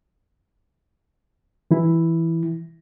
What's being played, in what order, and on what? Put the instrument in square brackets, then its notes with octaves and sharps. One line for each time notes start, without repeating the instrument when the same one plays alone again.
[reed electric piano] E3 E4